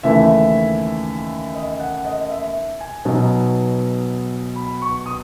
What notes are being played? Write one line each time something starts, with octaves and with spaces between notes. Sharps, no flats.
D#2 C#3 E3 A3 E4 E5
D#5
F#5
D#5
E5
G#5
B2 F#3 B3 D#4
B5
C#6
D#6